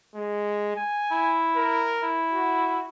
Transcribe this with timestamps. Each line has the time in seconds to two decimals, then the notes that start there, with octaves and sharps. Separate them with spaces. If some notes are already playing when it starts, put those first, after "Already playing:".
0.15 G#3
0.77 G#5
1.11 E4
1.56 A#4
2.03 E4
2.33 F#4